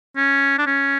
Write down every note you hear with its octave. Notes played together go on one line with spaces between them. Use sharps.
C#4
D4
C#4